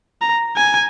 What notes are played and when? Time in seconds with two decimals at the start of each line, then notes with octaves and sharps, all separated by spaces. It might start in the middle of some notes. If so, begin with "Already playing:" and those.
0.21 A#5
0.56 G#5